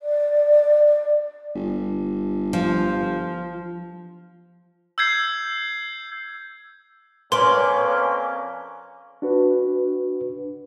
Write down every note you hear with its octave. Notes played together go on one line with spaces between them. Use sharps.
D5
G1
F3
E6 G6 G#6 C7
F2 A#3 C#4 B4 D5 C6
D4 F#4 B4